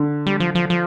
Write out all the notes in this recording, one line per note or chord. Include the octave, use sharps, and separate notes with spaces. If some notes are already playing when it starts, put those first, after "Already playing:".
Already playing: D3
G3
F3
F3
F3